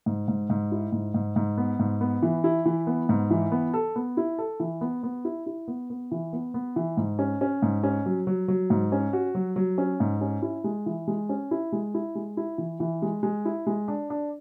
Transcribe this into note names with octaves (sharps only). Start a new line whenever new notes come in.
G#2
G#2
G#2
E4
G#2
G#2
G#2
B3
G#2
B3
E3
E4
E3
B3
G#2
E3
B3
A4
B3
E4
A4
E3
B3
B3
E4
E4
B3
B3
E3
B3
B3
E3
G#2
C#4
C#4
G#2
C#4
F#3
F#3
F#3
G#2
C#4
F#4
F#3
F#3
C#4
G#2
C#4
E4
G#3
E3
G#3
C#4
E4
G#3
E4
G#3
E4
E3
E3
G#3
G#3
E4
G#3
D4
D4